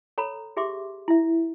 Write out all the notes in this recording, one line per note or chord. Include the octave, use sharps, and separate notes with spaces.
A4 C#5 A#5 B5
G4 G#4 E5 C6 D6
E4 E5